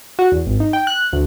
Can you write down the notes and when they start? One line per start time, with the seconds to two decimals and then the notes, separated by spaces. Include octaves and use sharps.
0.19 F#4
0.32 E2
0.46 G#1
0.60 D#4
0.73 G5
0.87 F#6
1.13 D2